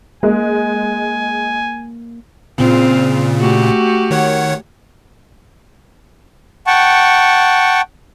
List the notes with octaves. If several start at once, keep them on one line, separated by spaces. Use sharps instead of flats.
G#3 A#3 G#5
A#2 C#3 C4 F4
A3 F#4 G4
D#3 C#5 F#5
F#5 G5 A5 C#6